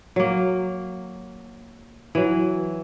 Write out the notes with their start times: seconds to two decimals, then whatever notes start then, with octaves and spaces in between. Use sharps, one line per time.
0.16 F#3 A#3
2.15 E3 F#3